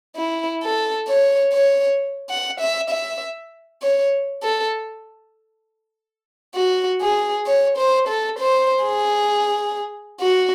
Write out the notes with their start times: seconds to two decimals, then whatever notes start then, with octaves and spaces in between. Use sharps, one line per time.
0.16 E4
0.63 A4
1.08 C#5
1.53 C#5
2.30 F#5
2.60 E5
2.90 E5
3.82 C#5
4.43 A4
6.55 F#4
7.01 G#4
7.46 C#5
7.78 C5
8.08 A4
8.39 C5
8.84 G#4
10.21 F#4